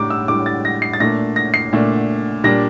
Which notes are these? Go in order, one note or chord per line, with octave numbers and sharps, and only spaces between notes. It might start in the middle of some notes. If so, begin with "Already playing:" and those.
Already playing: A2 G3 D4 A#5 D6
E6
A2 G3 D4 D6
A6
A#6
C7
A6
A#2 A3 D4 A#6
A#6
C7
A#2 A3 D4
A#2 G3 D4 A#6